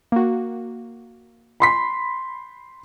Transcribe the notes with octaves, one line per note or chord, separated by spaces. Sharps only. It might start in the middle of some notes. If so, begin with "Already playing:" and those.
A#3 F#4
B5 C6 B6